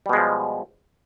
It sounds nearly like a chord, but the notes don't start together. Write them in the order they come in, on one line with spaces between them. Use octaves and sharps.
G3 B2 G#3 F3